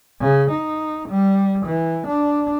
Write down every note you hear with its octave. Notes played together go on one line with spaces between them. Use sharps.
C#3
D#4
G3
E3
D4